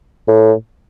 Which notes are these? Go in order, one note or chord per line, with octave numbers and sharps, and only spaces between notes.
A2